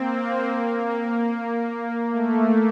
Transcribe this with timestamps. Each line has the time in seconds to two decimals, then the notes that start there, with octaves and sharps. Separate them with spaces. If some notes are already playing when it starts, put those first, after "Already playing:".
Already playing: A#3 C4
2.11 A3